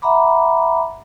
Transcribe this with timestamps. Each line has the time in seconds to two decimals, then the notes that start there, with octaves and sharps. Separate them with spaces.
0.02 E5 F#5 A#5 B5 D6